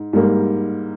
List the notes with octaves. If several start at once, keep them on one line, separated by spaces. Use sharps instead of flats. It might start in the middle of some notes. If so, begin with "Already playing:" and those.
Already playing: G#2
G#2 G3 A#3